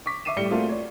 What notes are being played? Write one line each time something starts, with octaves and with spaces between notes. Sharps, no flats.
C#6 D6 B6
E5 C#6 D6 C7 D#7 E7
A2 G3 D5 C#7 G7
A3 A#3 C4 F4 F#4 G#4
C#5 D5